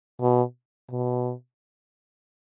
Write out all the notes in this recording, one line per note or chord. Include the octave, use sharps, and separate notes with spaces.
B2
B2